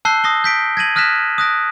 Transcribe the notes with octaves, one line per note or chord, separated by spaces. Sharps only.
A5 E6 F#6 G6 C7 G7
D#6 A#6 C7 G7
G6 B6 D7
G#6 A#6 D#7 F#7
D#6 F6 F#6 A#6 B6 E7
D#6 F#6 A#6 D7